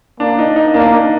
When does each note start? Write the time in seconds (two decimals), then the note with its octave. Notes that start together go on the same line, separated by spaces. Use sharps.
0.20 A#3 D4
0.39 D#4
0.56 D#4
0.74 A#3 D4
0.92 D#4